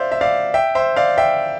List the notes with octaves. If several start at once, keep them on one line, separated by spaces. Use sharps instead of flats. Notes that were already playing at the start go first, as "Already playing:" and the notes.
Already playing: C5 D5 E5 F5
E5
D5 F5
E5 G5
C5 E5
D5 F5
E5 G5